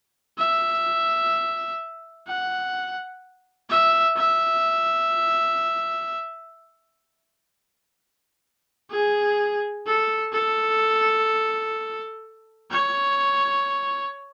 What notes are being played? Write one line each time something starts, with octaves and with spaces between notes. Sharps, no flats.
E5
F#5
E5
E5
G#4
A4
A4
C#5